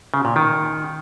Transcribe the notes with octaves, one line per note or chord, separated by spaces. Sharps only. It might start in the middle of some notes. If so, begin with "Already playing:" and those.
C#3
A#2
D#3